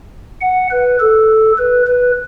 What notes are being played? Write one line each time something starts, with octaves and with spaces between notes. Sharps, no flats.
F#5
B4
A4
B4
B4